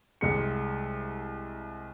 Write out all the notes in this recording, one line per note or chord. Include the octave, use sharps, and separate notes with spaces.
C2 G#3 C#7